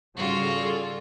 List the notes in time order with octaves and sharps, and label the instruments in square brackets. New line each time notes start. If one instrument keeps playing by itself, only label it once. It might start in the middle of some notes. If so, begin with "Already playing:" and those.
[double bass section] G#2 C#3 G3 [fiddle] F4 F#4 [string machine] G#4 A4 D5